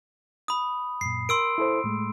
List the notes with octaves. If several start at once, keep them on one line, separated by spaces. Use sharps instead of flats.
B5 D#6
F#2 A#2 C7
A#4 C6 E6 D7
E4 A4 C5
A2 G#3 A3